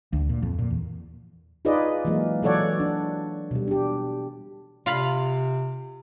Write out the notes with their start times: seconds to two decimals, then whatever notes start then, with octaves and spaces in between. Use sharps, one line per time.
0.13 D2
0.29 A#2
0.42 F2
0.59 A#2
0.70 E2
1.65 D#4 F4 G#4 B4 D5 D#5
2.05 E3 F#3 G#3 A#3
2.43 E3 F#3 A4 C#5 D5 F#5
2.80 D4
3.51 B2 G3
3.68 D4 G4
4.86 C3 F4 F5 B5